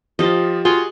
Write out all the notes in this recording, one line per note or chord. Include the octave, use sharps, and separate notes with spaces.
F3 F4 G4 D#5
F4 F#4 G#4 G5